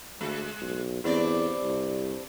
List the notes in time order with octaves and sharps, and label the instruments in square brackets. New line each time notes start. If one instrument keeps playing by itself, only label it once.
[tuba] D2 [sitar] G#3
[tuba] B1
[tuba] E2 [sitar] G2 C4 D5
[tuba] C2